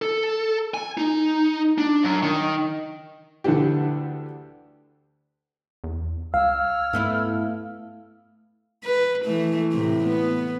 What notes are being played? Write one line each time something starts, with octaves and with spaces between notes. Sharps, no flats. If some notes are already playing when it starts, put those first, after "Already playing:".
A4
G#5
D#4
D4
F#2
D#3
D2 D3 E3 D4 G4
E2
C#2 C#5 F5 E6 F6
G#2 A3 B3 E4
B4
E3 A3
A2 C3
B3